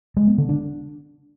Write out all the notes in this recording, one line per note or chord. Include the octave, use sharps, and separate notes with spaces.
G#3
B3
D3
D4